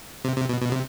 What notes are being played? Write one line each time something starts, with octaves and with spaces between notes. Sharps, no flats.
C3
C3
B2
B2
C3